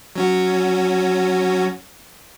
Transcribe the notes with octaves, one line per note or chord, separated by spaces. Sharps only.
F#3 C#4 F#4